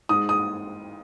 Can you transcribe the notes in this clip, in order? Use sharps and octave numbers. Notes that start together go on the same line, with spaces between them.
G#2 D#6
D#6